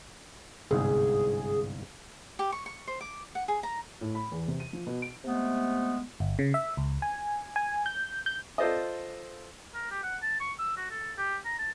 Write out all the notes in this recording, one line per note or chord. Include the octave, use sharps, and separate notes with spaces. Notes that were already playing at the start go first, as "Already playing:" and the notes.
G1 C2 G#2 G#4
G4
C#6
C#6
C5
D6
F#5
G#4
A#5
A2
B5
E2
C3
D#7
F3
B2
D7
C3 G#3 A3 B3
G1
C#3
E5
C#2
G#5
G#5
G6
G6
F4 A4 C5 D5 D#5
A#4
G4
F#5
A5
C#6
E6
F#4
A4
G4
A#5
A5